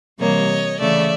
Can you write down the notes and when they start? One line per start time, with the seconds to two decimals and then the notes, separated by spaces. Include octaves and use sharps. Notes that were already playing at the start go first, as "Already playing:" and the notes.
0.19 C3 E3 G3 A#3 C#5 D#5
0.79 C#3 E3 A3 D5 E5